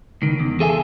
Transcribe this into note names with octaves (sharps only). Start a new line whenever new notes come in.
C#2 D#3
E2
G#4 A4 E5 F5 G#5